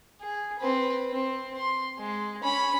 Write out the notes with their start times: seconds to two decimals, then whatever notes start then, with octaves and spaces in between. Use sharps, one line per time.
0.21 G#4
0.59 C4 B4
1.12 C4
1.57 C6
1.99 G#3
2.43 C#4 B5